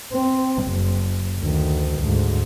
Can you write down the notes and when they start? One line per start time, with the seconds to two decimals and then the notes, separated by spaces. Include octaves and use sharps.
0.13 C4
0.64 F#1
1.39 D2 D#3
2.00 D2 G#2